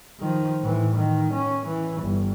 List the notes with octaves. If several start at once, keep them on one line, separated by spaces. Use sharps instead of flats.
D#3 F3
A2 E3
D#3
C#4
E3
G1